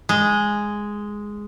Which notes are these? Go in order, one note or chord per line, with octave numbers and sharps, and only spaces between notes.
G#3